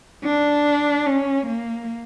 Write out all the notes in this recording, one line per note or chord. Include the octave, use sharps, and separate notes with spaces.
D4
C#4
A#3